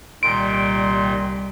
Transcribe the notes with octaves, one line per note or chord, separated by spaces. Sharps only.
C2 A#2 D#3 G3 C6 D7